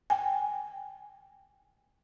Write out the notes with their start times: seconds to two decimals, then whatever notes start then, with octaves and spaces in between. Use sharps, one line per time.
0.10 G5 G#5